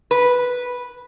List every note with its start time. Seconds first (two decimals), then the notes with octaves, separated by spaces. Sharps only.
0.11 B4